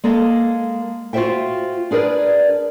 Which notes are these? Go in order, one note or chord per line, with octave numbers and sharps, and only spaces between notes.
G#3 A#3 A4 D#5
F4 F#4 A#4 C5 E5 G5
D4 G#4 A#4 B4 D5